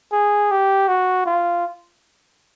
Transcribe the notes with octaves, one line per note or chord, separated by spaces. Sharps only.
G#4
G4
F#4
F4